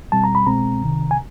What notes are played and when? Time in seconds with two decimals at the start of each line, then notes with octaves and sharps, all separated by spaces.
0.12 B2 G3 C4 A5
0.24 A#5
0.35 B5
0.47 C2 B2 G#3 C4 A#5
0.81 C2 C3 D#3
1.11 G#5